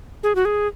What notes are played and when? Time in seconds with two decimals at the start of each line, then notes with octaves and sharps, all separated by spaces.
0.23 G#4
0.35 F#4
0.45 G#4